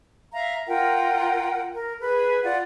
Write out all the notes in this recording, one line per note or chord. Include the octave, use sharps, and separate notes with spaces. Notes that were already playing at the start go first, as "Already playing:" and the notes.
E5 F5 A#5
F4 A#4 F#5 G5
A#4
G#4 B4
F4 D5 F#5